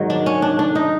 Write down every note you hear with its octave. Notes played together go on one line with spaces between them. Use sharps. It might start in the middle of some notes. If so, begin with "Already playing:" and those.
Already playing: G#2 D#3 F#3
D4
C#4
D4
D4
D#4